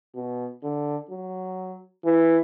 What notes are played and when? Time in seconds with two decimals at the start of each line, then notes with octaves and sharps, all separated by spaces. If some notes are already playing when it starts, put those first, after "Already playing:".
0.15 B2
0.63 D3
1.11 F#3
2.05 E3